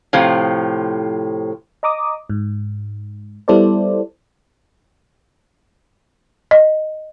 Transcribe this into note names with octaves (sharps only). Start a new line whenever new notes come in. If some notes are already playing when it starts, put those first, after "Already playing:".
A2 C3 F3
D#5 A#5 D6 D#6
G#2
G3 B3 E4 A4 C5 D5
D#5